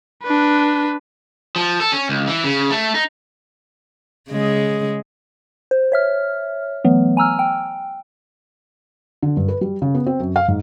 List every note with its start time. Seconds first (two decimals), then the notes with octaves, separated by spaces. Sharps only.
0.24 D4 B4
1.56 F3
1.80 A4
1.92 C#4
2.09 C#2
2.28 E3
2.44 C#3
2.71 A3
2.94 D#4
4.29 C#3 G#3
5.71 C5
5.92 C#5 E5 F6
6.85 E3 F#3 A3 B3
7.17 G#5 A#5 E6 F6
7.39 G5
9.23 D3
9.37 G2
9.48 B4
9.61 G3
9.82 C#3
9.95 B3
10.07 C4
10.20 F#2
10.36 F5
10.48 G#2